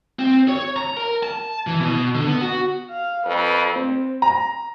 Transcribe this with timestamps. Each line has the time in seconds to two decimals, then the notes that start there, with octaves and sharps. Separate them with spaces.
0.19 C4
0.48 C#5
0.77 A#5
0.97 A#4
1.23 A5
1.67 E3
1.80 B2
2.15 D3
2.27 B3
2.41 F#4
2.91 F5
3.26 F2 B4
3.76 C4
4.22 A#5